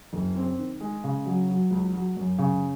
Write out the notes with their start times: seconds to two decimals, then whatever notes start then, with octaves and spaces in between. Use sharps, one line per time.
0.13 F#1
0.36 C4
0.59 D#3
0.81 G#3
1.04 C#3
1.26 F#3
1.49 F#3
1.71 C#2
1.93 F#3
2.17 F#2
2.38 C#3